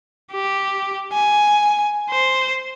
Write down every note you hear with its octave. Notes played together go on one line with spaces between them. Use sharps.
G4
G#5
C5